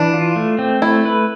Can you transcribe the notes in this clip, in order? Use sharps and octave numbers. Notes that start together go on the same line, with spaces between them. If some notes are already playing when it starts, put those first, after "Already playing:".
Already playing: E3 D4
F4
A3
C4
A3 E4
B4